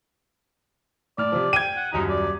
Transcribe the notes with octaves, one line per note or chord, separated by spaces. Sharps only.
A2 D5 F6
C3 F3
G5 G#6 D#7
F#5
D#1 F#2 D#4
D5